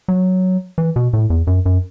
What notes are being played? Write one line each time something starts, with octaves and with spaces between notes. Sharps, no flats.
F#3
E3
B2
A2
E2
F#2
F#2